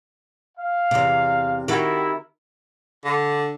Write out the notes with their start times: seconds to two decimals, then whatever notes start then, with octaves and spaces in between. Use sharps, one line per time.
0.58 F5
0.91 E2 C3
1.68 D#3 E4 F#4 G4
3.04 D3